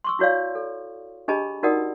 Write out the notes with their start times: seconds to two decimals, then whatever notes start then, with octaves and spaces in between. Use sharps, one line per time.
0.04 C6 C#6 E6
0.19 E4 F#4 C#5 D5 F5
0.55 A4
1.28 D4 G4 G#4 D#5 A5 B5
1.63 D#4 F#4 A#4 D5 F#5 D#6